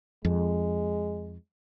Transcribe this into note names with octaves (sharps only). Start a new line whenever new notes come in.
F2 G#3